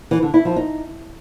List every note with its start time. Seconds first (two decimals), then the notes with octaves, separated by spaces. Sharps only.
0.11 E3
0.22 D3
0.34 E4
0.45 F3
0.56 D#4